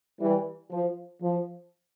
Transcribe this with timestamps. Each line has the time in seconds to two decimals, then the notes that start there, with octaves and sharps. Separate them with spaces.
0.20 E3 G3
0.71 F3
1.22 F3